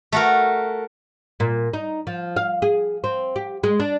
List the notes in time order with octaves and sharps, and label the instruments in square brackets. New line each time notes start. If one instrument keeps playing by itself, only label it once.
[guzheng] A3 F#4 A#4
[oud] A#2
D#4
F3
F5
G#4
C4
G4
G#3
D4